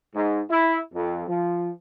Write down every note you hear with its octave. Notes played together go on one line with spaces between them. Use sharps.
G#2
E4
F2
F3